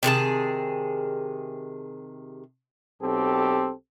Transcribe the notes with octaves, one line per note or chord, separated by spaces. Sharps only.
C3 D#3 G#4 A5
B1 C4 G4 A4